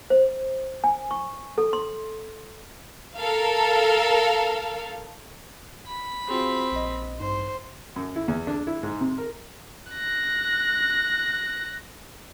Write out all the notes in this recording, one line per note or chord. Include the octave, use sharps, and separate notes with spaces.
C5
G#5
C#6
A4
C6
A4 A#4 F5
B5
C4 F4 F#4 G#4
A#1 D#5
A1 G2 D#4 C5
F#2
E4
E2
D4
E4
G#2
C3
A#4
F#6 A#6